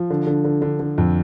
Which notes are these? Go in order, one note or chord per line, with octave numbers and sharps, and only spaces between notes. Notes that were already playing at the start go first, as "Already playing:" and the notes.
Already playing: F3
D3
D3
D3
D3
D3
F2